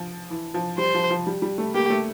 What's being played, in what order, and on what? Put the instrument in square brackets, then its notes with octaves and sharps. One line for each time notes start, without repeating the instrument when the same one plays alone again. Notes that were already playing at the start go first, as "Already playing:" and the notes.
Already playing: [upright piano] F3
E3
F3
[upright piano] G3 [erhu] C5
[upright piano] F3
F3
G3
G3
A3
[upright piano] A#3 [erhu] G4
[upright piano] A3